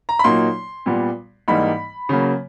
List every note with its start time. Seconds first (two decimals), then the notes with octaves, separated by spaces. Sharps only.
0.09 A#5
0.19 B5
0.24 A#2 F#3 A#3 D#4 C6
0.86 A#2 G3 B3
1.48 G#2 E3 G3 A#3 D#4 B5
2.09 C#3 F#3 A#3